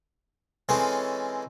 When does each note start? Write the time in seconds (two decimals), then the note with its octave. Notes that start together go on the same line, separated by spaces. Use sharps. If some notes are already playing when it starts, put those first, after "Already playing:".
0.69 E3 G#3 C4 C#4 A4